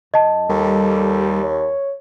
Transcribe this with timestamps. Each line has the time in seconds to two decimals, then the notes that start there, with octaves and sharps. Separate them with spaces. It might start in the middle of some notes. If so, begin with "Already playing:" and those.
0.14 F#2 D#5 A5
0.49 D#2 G3 A4
1.43 C#5